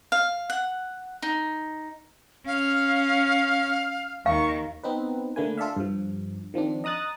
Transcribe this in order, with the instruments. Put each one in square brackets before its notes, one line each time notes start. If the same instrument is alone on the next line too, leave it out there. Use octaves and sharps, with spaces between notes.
[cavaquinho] F5
F#5
D#4
[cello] C#4 [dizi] F5
[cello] D#2 D#3 [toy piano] F5 [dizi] C#6
[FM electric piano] B3 C4 D#4 B4
D3 A3 A#3 B4 G#5
F4 A4 D5 E5 F5
G2 F3
D#3 F3 C4 D4
D#5 A#5 D#6 F#6 A6